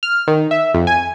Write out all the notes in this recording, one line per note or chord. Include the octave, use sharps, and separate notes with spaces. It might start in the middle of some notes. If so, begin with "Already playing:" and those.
F6
D#3
E5
F2
G#5